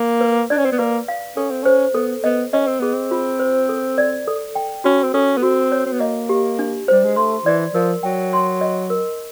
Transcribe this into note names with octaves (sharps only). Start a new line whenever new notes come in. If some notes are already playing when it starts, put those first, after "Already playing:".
Already playing: A#3
B4
D4 D5
C#4
C4
B3
A#3 B4
F5
C#4 A4
C4
C#4 C5
B3 A4
B3 D#5
C#4 D#5
C4
B3 G#4
C4
F4
C5
A4
D5
A4
G5
C#4 F#4
C4
C#4 A4
B3
C4 F#4
C#5
C4
B3
A#3 D#5
G4
D4
G3 C5
G#3
A3 C6
E3 D5
F3 A#4
F#3 G5
C6
D#5
A#4